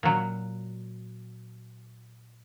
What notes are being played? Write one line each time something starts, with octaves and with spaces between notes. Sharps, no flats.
A#2 F#3